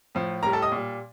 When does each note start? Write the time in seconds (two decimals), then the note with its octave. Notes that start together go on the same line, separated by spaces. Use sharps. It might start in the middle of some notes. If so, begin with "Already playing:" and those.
0.15 A2 F3
0.43 A2 G3 A#4 A#5
0.53 A4 A5
0.62 D#5 D#6
0.72 A#2 G3